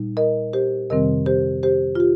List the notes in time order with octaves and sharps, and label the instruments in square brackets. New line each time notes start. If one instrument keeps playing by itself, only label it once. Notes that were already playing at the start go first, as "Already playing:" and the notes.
Already playing: [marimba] A#2 G3 D#4
A#4 D#5
G4 C5
F2 C3 D#3 G3 C4 A#4 D#5
G4 C5
G4 C5
F4
G4